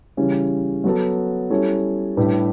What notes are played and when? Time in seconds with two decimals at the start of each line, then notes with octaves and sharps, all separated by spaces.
0.17 C#3 E3 G3 C#4
0.84 F#3 B3 F#4 A4
1.50 G3 C#4 E4 A4 C#5
2.17 A2 G3 D4 G4 B4